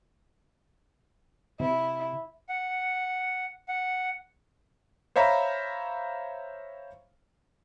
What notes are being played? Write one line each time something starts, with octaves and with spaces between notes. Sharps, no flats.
C3 E4
F#5
F#5
C5 C#5 E5 F5 A#5 B5